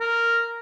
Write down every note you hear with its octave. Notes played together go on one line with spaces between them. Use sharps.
A#4